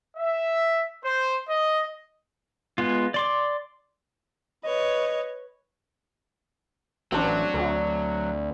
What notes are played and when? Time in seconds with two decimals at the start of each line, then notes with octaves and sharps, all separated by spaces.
0.17 E5
1.05 C5
1.50 D#5
2.78 G#3 B3 F4
3.14 D5 C6 D6
4.64 B4 C#5 D#5
7.12 A1 F#3 C4 D4
7.54 D2